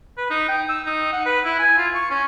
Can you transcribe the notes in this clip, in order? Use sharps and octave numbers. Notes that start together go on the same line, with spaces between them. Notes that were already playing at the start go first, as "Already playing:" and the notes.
B4
D#4
G5
E6
D#4
F#5
B4
E4
G#5
F4
C#6
C#4